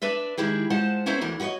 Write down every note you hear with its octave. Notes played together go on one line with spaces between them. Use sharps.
D4 B4 D5 E5
D#3 G#3 E4 G4 G#4
G#3 F4 C5 F#5 A5
B3 C#4 E4 A4 C5 A#5
D2 D3 E3 A#4
F#4 G4 B4 C#5 D#5